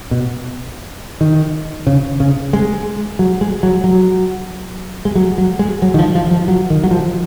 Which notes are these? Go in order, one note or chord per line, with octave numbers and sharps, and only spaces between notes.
B2
D#3
C#3
C#3
G#3
F#3
G#3
F#3
F#3
G#3
F#3
F#3
G#3
F#3
D#3
F3
F3
F3
F#3
D#3
F#3
F3